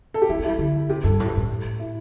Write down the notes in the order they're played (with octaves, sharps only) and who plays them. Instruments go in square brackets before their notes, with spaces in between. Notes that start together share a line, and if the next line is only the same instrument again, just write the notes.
[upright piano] A4
G4
[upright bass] C4 [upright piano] E4
[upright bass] C4
[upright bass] G3 [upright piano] E4
[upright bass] D3
[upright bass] C3 [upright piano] G4
[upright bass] G2 [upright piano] A4
[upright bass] A2
G2
A2
[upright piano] E4